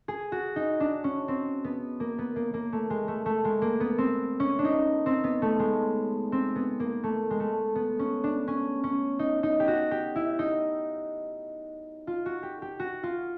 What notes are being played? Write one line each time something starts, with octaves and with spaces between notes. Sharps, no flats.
G#4
F#4
D#4
D4
C#4
C4
B3
A#3
B3
A#3
A#3
A3
G#3
A3
A3
G#3
A#3
B3
C4
C#4
D4
D#4
C4
B3
A3
G#3
C4
B3
A#3
A3
G#3
A3
B3
C#4
D4
C#4
C#4
D#4
D#4
G4
F#4
G4
E4
D#4
F4
F#4
G4
G4
F#4
F4